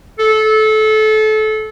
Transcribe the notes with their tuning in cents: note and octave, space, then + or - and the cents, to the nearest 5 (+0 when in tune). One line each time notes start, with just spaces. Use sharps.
A4 -25